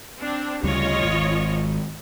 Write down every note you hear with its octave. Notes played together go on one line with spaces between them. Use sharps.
C4 D4
D2 C#3 G3 F4 C#5 D#5
G#1